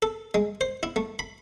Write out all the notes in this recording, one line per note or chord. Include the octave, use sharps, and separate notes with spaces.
A4
G#3
C5
E4
A3
B5